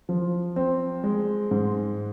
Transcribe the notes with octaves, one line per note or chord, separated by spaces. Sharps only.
F3
C4
G#3
G#2